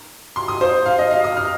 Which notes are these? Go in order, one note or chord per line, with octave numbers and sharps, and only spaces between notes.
C6
D#6
C5
F5
D#5
F5
D#6
F6